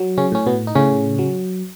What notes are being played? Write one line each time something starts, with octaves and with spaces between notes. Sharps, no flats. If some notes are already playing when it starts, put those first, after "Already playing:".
Already playing: F#3
C#3 C#4
A2 C#4
B2 B3
D#4
A2 C#3 C#4
F#3